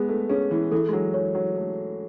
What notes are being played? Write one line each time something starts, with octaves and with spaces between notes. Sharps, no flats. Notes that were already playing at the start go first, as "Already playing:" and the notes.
Already playing: G#3 B3 G#4 B4
A3
C#4 G#4
E3
E3 A4
G#3
F#3
F#3 C#5
F#3
A3 A4